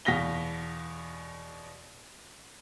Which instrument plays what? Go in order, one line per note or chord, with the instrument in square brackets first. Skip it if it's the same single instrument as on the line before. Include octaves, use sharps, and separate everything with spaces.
[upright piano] E2 B2 F5 A#6 B6 G7